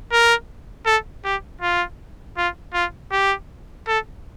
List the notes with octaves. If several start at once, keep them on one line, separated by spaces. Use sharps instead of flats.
A#4
A4
G4
F4
F4
F4
G4
A4